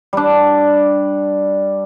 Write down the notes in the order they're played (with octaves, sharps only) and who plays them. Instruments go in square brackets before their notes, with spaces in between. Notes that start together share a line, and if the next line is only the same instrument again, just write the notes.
[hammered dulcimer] G3 D4